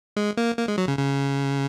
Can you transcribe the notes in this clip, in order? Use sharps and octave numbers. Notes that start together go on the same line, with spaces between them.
G#3
A#3
A#3
G#3
F#3
C#3
C#3